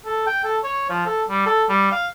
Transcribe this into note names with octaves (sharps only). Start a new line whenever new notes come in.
A4
G5
A4
C#5
F3
A4
G3
A4
G3
F5